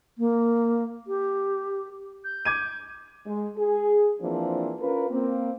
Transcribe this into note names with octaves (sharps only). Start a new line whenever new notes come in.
A#3
G4
G6
D6 G#6 D#7
G#3
G#4
E3 F3 A#3 C4 D4
C#4 F4 A#4 B4
A#3 C4